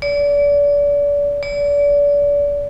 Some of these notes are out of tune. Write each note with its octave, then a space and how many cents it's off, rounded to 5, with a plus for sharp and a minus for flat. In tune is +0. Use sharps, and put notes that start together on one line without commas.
D5 -35
D5 -35